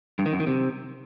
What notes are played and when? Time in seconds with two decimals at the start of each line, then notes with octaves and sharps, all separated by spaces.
0.19 G2
0.26 D#3
0.33 F#2
0.40 D#3
0.47 C3